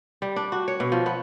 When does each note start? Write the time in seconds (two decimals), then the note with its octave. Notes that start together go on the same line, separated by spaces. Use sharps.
0.22 G3
0.36 D4
0.52 F#4
0.68 C#5
0.80 B2
0.92 F3
1.06 B3